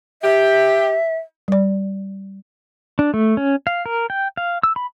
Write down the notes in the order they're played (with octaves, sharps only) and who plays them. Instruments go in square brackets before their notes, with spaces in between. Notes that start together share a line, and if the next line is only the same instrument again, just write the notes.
[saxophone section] G4 [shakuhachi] E5
[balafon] G3 D5
[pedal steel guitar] D4
A3
C#4
F5
A#4
G5
F5
E6
B5